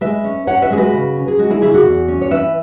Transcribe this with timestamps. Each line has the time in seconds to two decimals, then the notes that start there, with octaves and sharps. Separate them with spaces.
0.01 G#3 B4 E5
0.24 C#4
0.47 C#4 C#5 F#5
0.62 B4 E5
0.70 G#3 G#4
0.78 F#4 B4
0.93 C#3
1.16 C#4
1.28 G#4
1.38 G#3 F#4
1.50 E4 G#4
1.61 C#3 E4 G#4
1.74 F#4
1.85 E2
2.08 C#4
2.22 C#5
2.31 E3 B4 E5